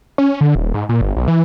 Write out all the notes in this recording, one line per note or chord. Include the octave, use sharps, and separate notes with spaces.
C#4
D3
D#1
G#2
A#2
G1
B1
E3